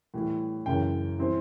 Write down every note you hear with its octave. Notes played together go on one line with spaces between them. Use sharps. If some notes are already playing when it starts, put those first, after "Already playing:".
A2 E3 G3
F#2 C#3 E3 G5
E3 G3 C4 E4